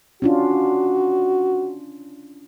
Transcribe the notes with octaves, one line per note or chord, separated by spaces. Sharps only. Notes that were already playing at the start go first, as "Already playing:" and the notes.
C#4 D4 F4 F#4